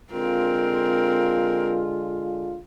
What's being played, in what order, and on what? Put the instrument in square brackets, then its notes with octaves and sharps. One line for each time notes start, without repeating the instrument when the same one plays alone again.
[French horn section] D3 G#3 F4 [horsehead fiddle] C4 A#4